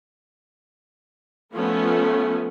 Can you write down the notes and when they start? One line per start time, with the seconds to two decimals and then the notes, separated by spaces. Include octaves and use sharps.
1.53 F3 A3 B3 C#4